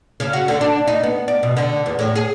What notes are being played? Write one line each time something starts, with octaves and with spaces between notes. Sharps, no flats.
C#3
F#4
D3
D4
D#4
B3
D5
B2
D3
E2
A2
G#4